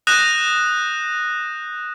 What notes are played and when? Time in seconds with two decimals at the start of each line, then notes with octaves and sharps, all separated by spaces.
0.07 D#6 F#6 G6 A#6 D#7 E7